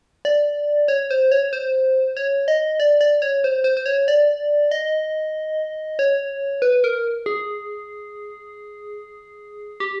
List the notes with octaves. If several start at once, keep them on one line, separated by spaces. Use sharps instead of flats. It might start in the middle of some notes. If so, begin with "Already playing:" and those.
D5
C#5
C5
C#5
C5
C#5
D#5
D5
D5
C#5
C5
C5
C5
C#5
D5
D#5
C#5
B4
A#4
G#4
G4